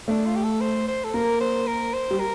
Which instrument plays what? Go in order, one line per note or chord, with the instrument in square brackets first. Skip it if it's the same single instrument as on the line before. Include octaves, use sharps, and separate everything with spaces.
[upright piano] A3 [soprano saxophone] D4
[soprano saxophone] F4
G4
A4
C5
C5
A4
[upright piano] A#3 [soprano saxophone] A#4
[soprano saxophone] C5
A#4
C5
[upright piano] G3
[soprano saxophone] A#4